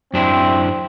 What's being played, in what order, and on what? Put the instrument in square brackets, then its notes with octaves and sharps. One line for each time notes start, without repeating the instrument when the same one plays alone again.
[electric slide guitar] F#2 D4 E4 [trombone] C4